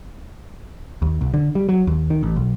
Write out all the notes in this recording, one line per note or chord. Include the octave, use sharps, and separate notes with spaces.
D#2
C2
D3
G3
F#3
D#2
D#3
A1
B1